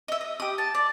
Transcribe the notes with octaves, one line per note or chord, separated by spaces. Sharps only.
D#5 E5
D#5
G4 D#6
A5
D5